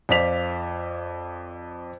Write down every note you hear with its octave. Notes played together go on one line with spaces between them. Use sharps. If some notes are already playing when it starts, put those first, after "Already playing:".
F2 F4 C5 D5 B6 F7